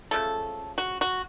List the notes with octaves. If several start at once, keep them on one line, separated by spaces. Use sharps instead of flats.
C#3 F3 A3 A4
F#4
F#4